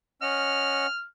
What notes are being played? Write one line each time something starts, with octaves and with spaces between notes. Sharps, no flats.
C#4 D#5 F#5 F6